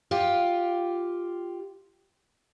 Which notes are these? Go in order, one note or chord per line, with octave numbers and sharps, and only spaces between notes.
F4 G4